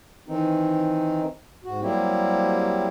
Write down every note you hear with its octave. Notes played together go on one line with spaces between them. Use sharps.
D#3 E3 C4 D#4
G#2 F#4
F#3 G3 A#3 C4 E4 G4